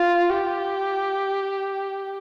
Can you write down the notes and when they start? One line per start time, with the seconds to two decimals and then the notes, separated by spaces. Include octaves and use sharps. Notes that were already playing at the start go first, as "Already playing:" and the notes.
Already playing: F4
0.30 G4